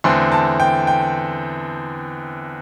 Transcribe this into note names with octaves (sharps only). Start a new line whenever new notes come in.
E2 D3 A3 C4 C6
A5
G5
G5